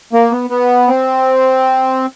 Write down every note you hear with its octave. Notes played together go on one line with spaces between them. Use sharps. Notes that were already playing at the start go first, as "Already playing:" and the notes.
A#3
B3
B3
C4